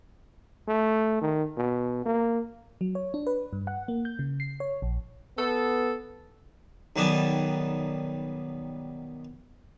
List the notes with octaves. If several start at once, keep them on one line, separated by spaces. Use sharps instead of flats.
A3
D#3
B2
A#3
F#3
C#5
D4
B4
G2
F#5
A#3
G6
C#3
C7
C#5
A#1
B3 A4
B1 D#3 G3 B3 G#5 A5